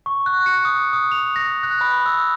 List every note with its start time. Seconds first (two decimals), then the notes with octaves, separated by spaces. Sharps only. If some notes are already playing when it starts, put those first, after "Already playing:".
0.06 C#6
0.26 F#6
0.46 C#7
0.65 D#6
0.93 D#6
1.11 F7
1.36 A#6
1.63 F#6
1.81 B5
2.06 E6